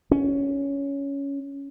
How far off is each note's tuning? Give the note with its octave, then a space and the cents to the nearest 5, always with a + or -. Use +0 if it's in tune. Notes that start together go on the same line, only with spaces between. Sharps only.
C#4 +10